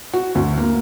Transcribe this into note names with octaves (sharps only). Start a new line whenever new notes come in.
F#4
D2
A#3